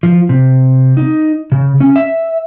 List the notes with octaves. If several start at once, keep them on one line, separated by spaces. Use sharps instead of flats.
F3
C3
D#4
C#3
C#4
E5